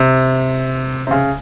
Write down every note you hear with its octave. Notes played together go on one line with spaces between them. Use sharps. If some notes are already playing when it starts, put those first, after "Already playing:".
Already playing: C3
C3
C#3